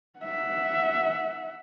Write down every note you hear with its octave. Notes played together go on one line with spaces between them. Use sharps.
E5 F#5